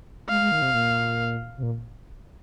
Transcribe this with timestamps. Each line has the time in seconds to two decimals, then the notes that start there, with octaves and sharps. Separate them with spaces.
0.29 G#3 F5
0.41 G#3
0.51 D#3
0.62 C3
0.74 A#2
1.58 C3
1.63 A#2